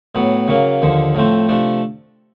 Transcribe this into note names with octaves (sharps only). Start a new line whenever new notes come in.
A2 F#3 B3
C#3 F#3 A#3
D#2 D3 F3
A2 F3 A3 C4
C3 F3 A3 D4